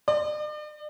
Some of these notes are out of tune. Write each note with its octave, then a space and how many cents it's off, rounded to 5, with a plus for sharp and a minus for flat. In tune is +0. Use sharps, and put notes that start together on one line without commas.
D5 +45